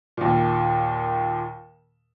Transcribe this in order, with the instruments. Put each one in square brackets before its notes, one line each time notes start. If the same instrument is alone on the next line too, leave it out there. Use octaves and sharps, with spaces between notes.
[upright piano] D#2 A#2